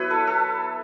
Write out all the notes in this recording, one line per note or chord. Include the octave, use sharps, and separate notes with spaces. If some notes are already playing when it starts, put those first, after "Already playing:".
Already playing: F#3 B3 E4 B4 C#5
A4
A4